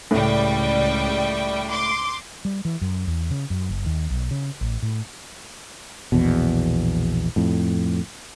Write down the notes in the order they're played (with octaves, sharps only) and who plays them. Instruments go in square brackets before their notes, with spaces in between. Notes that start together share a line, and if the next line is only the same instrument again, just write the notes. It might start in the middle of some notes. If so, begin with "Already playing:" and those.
[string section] C#2 G3 G5 [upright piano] A2
[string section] C6 D6
[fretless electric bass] G3
E3
F#2
E2
C#3
F#2
F#1
D#2
B1
C#3
A1
A2
A#1 E2 B2
F2 A2